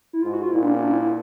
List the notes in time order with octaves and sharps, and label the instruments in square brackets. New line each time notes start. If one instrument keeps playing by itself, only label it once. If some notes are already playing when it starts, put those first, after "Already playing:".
[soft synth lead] E4
[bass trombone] G#2 [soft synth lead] F4
[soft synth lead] F#4
F4
[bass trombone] A#2 [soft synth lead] E4
[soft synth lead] D4
C#4
D4
E4
E4